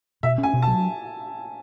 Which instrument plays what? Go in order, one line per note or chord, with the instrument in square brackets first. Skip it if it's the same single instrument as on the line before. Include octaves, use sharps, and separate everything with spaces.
[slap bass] B2 [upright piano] E5
[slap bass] C#4
[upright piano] G#5
[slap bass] B2
[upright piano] A5
[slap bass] F#3